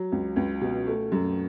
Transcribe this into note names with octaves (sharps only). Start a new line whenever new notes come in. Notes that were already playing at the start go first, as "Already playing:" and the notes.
Already playing: F#3
C#2
C#2
B2
A3
F#2